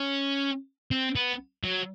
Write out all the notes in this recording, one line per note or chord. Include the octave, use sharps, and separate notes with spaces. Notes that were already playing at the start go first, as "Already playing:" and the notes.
Already playing: C#4
C4
B3
F#3